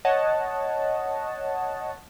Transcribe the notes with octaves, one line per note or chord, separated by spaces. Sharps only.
C#5 D#5 F#5 A5